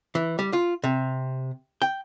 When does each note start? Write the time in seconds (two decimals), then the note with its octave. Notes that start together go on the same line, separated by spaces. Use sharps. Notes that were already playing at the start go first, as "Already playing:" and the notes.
0.15 E3
0.39 G3
0.53 F4
0.84 C3
1.82 G5